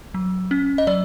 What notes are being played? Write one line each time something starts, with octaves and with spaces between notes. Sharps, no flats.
F#3
C#4
D#5
F#3 D5